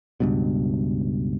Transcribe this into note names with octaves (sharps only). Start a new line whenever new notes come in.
C#2 G2 B2